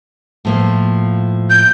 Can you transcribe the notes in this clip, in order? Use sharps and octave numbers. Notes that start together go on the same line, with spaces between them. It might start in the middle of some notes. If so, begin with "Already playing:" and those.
A2 F3 A#3
G6